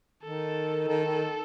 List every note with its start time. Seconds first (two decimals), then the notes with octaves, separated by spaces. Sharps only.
0.23 D#3 A4
0.88 D#3 A4
1.06 D#3